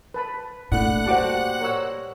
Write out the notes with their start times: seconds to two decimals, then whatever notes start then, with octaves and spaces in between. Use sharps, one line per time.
0.14 B4 A5 B5
0.72 A#2 A3 D4 E4 F#5 F#6
1.06 G3 F#4 C5 A5 D6
1.61 A#4 C#5 E6